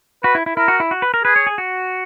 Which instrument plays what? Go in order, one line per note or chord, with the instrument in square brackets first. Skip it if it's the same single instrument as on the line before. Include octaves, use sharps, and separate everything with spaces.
[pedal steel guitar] F#4 [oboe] B4
[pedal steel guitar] E4
E4
[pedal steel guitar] E4 [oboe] A#4
[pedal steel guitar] F#4
E4
F#4
B4
A#4
[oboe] G#4 [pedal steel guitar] B4
[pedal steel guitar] C#5
G#4
F#4